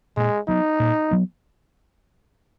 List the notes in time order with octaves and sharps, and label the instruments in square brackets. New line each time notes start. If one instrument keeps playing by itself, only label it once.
[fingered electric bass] A#2 [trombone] G#3
[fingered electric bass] F#3 B3 [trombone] D#4
[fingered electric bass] A#2
F#3 B3